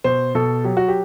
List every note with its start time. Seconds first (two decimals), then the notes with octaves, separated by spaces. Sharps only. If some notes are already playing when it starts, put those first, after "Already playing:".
0.04 B2 C5
0.35 B2 A4
0.64 F#3 G4
0.77 F#4
0.88 G4